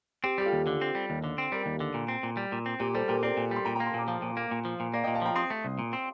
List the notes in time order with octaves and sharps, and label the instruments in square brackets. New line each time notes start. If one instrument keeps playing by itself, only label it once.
[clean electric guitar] C4 [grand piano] G4
[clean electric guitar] G3 [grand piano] G4
[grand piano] F4 A4
[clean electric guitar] D#2
D3
C4
G3
D#2
D3
C4
[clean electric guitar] G3 [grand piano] G4 A#4
[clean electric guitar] D#2
D3
A#2
C4
A#2
G3
A#2
C4
[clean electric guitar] A#2 [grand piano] G4
[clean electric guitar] G3 [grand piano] A4 C5
[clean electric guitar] A#2 [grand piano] G4 A#4
[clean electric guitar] C4 [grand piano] A#4 D5
[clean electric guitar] A#2
[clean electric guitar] G3 [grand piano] C6
[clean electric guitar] A#2 [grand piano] G5 A#5
[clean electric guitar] A#3 [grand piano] G5 A#5
[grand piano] A5 C6
[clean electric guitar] A#2 [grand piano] A#5 D6
[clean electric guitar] F3 [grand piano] F5 A5
[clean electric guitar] A#2
A#3
A#2
F3
A#2
[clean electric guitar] A#3 [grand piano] D5 F5
[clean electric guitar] A#2 [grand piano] D#5 G5
[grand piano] F5 A5
[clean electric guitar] F3 [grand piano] G5 A#5
[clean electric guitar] C4 [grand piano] C6 D#6
[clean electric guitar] A3
C2
A#2
C4